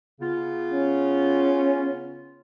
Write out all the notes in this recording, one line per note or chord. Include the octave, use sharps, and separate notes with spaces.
C#3 B3 F4
C#4